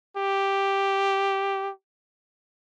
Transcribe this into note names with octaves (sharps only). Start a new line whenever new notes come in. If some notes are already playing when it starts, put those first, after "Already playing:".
G4